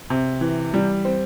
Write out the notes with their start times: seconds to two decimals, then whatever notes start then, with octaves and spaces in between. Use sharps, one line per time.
0.10 C3
0.41 E3
0.74 G3
1.05 C4